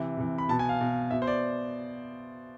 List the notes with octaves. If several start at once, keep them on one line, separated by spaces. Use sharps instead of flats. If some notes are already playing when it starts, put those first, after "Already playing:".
Already playing: C3 E3
C3 E3
B5
B2 A5
G#5
F5
B2
B2 E5
C5
D5